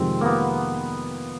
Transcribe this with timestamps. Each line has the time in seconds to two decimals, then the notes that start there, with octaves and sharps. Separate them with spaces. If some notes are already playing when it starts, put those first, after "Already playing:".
Already playing: F2 C3 D#3 G#3 C4
0.21 A#3 B3